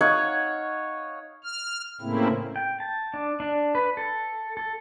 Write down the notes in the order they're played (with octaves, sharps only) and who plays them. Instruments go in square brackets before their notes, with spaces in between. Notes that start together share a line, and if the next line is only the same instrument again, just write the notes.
[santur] D#4 C#5 F5 F#5
[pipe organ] F6
A2 C#3 A3 A#3 C4 E4
[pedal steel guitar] G5
A5
D4
D4
B4
A4
A4